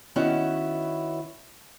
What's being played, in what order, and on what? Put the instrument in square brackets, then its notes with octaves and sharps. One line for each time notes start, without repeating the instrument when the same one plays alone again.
[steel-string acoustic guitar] D#3 B3 C#4 E4 F#4 B4